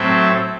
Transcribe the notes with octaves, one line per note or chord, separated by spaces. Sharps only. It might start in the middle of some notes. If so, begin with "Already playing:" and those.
Already playing: A2 F#3 A3 C4 E5